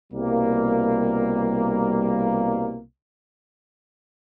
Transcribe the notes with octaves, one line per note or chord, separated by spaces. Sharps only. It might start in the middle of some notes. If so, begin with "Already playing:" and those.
C2 B2 G3 A#3